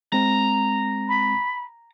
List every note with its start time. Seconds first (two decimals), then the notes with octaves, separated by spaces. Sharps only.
0.12 G#3 C4 A#5
1.08 B5